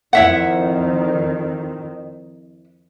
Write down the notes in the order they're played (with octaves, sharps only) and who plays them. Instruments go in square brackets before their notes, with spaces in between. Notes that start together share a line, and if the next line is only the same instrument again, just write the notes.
[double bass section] F2 D#3 [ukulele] E4 E5 F#5